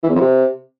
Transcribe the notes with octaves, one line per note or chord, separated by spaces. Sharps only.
E3
E2
F2
C3